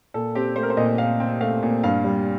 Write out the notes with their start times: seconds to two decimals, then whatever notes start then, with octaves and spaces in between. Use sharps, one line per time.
0.14 A#2 A4
0.35 C4 G4
0.56 A3 C5
0.63 A#4
0.70 C5
0.77 A#2 D#5
0.98 A#2 F5
1.20 C4
1.41 A3 F5
1.63 A#2
1.84 G2 F5
2.04 G3